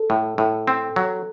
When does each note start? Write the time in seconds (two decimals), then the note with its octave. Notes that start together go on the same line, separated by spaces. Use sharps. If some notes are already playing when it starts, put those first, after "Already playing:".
Already playing: A4
0.10 A2
0.38 A2
0.68 C4
0.96 F#3